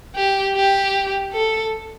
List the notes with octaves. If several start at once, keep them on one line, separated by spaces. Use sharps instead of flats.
G4
G4
A4